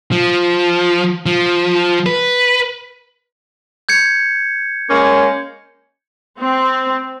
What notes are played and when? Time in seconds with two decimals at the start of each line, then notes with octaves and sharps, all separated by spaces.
0.12 F3
1.26 F3
2.06 B4
3.89 G6 G#6 C#7
4.89 G#3 A#3 C#4
6.39 C4